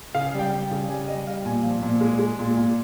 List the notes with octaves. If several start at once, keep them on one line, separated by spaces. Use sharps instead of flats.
C#3 F5
G3
G5
G3
C#3
G3 G#5
G3 D#5
G3 F5
A#2 G#5
F3
A#2
G#3
G#3
A#2
A#2